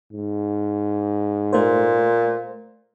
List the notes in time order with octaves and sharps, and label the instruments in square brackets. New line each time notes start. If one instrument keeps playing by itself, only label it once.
[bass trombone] G#2
[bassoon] A#2 [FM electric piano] A3 C5